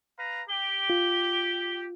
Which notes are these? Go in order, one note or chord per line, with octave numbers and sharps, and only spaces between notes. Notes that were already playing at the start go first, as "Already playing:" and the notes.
B4 F5 A#5
G4 G7
F4